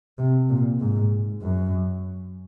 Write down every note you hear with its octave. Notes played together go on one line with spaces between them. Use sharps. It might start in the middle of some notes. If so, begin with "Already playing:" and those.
C3
A#2
G#2
F#2